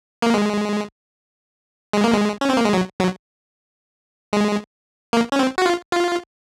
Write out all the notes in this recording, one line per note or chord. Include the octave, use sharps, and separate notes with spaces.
A#3
G#3
G#3
A#3
G#3
C#4
C4
A#3
G#3
F#3
F#3
G#3
A#3
C#4
C4
F#4
F4
F4